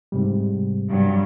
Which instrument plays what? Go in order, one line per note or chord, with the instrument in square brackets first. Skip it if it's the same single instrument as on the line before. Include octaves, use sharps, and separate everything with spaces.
[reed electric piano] G#2 C3 G3
[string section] G2 F#3